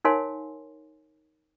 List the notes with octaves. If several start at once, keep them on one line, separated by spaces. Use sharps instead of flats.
D#4 A#4 C#5 F5 G#5 C6